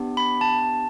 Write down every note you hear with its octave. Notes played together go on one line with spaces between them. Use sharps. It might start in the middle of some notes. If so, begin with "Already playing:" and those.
Already playing: B3 D4 G4
B5
A5